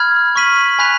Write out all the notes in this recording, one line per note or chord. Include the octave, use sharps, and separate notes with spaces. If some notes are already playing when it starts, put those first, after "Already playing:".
Already playing: B5 F6 G#6
C#6 F6 B6 D#7 F#7
G#5 B5 F#6 B6 F7